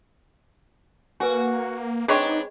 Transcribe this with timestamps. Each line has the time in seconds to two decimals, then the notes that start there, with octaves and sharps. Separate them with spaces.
1.20 A#3 F#4 B4 G#5
2.08 G#3 C4 D4 D#4 G#4 B4 C#5 D#5